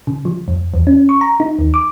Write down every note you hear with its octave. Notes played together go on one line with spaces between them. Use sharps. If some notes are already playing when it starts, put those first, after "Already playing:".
C#3
F3
F2
E2
C#4
C#6
A#5
D#4
D#2
D6